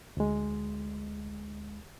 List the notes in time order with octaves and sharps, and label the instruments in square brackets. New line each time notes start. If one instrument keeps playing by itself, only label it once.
[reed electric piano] D2 G#3